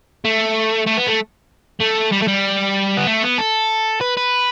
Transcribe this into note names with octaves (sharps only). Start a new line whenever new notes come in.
A3
A3
B3
A3
A3
G3
A3
G3
B3
A3
B3
A4
B4
B4